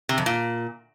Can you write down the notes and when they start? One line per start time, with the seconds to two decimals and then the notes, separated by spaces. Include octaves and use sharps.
0.09 C3
0.18 F2
0.26 A#2